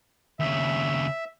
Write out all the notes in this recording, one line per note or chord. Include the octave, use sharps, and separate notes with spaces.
D#2 C#3 E5